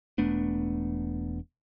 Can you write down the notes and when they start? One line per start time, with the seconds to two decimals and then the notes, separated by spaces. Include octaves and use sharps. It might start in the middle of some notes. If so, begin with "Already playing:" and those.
0.18 E1 A3 B3 D4